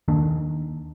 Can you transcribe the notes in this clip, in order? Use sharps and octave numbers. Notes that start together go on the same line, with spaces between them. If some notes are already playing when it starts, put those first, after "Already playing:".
D#2 D#3 A#3 D4